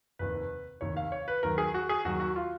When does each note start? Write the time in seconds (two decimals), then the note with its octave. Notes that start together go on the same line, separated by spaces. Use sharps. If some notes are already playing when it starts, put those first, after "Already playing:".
0.19 F1 D#2 D#3 B4
0.81 F1 D#2 D#3 C#5
0.97 F5
1.12 C#5
1.28 B4
1.43 D#2 D#3 F#3 A#4
1.58 G#4
1.74 F#4
1.89 G#4
2.05 D#2 D#3 F#3 F#4
2.20 F#4
2.36 F4